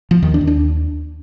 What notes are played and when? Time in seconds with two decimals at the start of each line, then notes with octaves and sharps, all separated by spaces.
0.11 F3
0.22 D#2 D#3
0.34 D4
0.41 D#2
0.47 D4